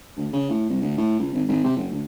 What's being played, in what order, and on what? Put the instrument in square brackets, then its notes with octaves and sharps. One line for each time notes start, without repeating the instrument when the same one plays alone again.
[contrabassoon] D2
C#3
A2
C2
D2
A2
C#2
G#1
G#1
C3
F#1
D2